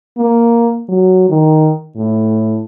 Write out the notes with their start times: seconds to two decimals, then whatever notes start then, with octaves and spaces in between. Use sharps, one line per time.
0.18 A#3
0.89 F#3
1.29 D#3
1.96 A2